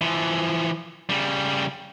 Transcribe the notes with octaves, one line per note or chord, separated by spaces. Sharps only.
E3 F3
C#3 G3